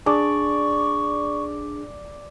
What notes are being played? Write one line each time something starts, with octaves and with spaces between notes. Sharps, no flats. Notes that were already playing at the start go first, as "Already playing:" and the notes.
D4 G#4 D5 C#6